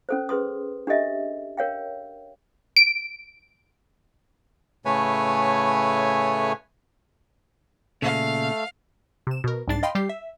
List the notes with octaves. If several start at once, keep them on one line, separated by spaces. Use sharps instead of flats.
C#4 A4 C5
G#4 B4 C6 D#6
D4 G4 A4 D#5 E5
A#4 C#5 F5 G5
D7
A2 C#3 A3 B4 C#5 G#5
A#2 C#3 A3 F5
C3 E7
B2 A#4
C2 G#2 D4 A6 C7
D#5 F5 G5 B5 C6
G3 G4 C7
E5